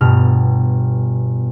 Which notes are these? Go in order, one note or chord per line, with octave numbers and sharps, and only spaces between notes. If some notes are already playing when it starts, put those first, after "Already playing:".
G1 B2 G3 F6